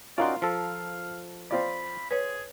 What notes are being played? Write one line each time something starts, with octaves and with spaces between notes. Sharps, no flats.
C#4 D#4 F4 F#4 A#4 D5 C6
F3 A4 F5
C4 F4 D5 B5
G#4 B4 C#5